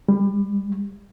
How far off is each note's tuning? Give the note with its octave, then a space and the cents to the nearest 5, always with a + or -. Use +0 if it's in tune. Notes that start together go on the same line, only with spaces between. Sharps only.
G3 +30